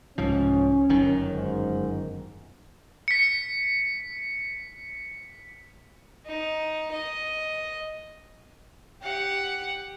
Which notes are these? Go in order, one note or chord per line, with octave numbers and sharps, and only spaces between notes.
C2 G#2 F3 C#4
G1 F#2 D#3
G#2
B6 C#7
D#4
D#5
G4 F#5